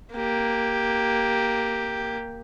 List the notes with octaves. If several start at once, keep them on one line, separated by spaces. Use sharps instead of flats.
A#3 G4